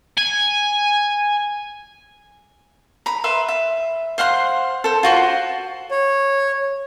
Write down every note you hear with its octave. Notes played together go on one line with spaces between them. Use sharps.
G#5
A#5 B5
B4 E5 C6
E5
C5 F5 F#5 C6
A4 C5
F4 F#4 C5
C#5